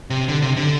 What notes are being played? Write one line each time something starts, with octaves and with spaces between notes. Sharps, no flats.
C3
D3
C3
D3